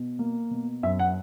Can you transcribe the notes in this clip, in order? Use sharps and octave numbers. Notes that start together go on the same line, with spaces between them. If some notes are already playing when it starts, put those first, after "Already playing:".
Already playing: B2
A#3
B2
F#2 E5
F#5